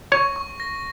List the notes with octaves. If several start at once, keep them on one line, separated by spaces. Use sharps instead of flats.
C#5 C#6
C#6
A#6